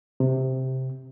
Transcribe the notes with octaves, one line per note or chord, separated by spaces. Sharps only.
C3